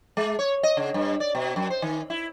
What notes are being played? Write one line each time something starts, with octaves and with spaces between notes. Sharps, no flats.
G#3
C#5
D#5
C#3
G2
D5
B2
F#2
C5
D#3
E4